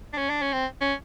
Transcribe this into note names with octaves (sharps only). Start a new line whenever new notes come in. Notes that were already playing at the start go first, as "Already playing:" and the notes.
D4
C#4
D4
C#4
C4
C#4